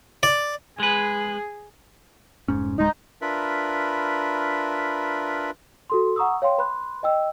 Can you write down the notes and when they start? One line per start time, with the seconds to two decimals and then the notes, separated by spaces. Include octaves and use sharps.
0.23 D5
0.80 G#3 G#4 B4
2.48 F1 G#2 C#4
2.78 D1 G#3 D#4
3.21 D4 F4 A#4 B4 E5 B5
5.90 F#4 A4 C6
6.16 F#5 A#5 C#6 D#6 E6
6.42 C#5 F5 G5 C6
6.58 B4 B5 C6 F#6
7.03 D#5 G5 E6